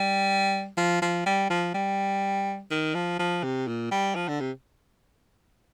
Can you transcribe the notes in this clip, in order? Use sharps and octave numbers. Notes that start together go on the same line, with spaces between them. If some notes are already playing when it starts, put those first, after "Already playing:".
Already playing: G3
F3
F3
G3
F3
G3
D#3
F3
F3
C3
A#2
G3
F3
D3
C3